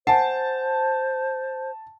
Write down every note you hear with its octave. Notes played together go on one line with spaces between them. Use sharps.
C5 F#5 G#5 A5